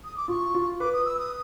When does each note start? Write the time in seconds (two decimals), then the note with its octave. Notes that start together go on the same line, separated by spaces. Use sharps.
0.05 D#6
0.17 D6
0.28 F4 C#6
0.54 F4
0.80 B4 D6
0.93 D#6
1.06 E6
1.19 D#6